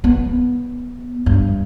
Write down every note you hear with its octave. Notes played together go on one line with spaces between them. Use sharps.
B3
G2